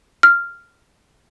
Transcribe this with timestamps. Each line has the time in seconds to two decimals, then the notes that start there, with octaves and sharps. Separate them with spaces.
0.23 F6